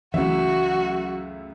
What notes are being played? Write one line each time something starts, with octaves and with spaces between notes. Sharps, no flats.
C#2 F#2 E3 A3 F#4 E5